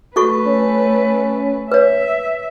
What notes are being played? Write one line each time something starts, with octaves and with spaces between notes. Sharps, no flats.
A3 F#4 A4 B4 C#6
C#4
B4 C#5 E5